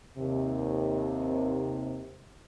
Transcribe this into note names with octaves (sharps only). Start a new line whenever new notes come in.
D#2 C3